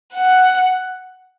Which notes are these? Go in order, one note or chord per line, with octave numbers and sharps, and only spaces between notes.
F#5